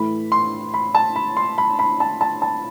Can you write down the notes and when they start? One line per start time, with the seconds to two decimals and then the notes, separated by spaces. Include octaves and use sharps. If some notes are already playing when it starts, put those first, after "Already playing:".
Already playing: A2 E3 A3 B5
0.32 C6
0.74 B5
0.95 A5
1.16 B5
1.37 C6
1.58 B5
1.79 B5
2.00 A5
2.21 A5
2.42 A5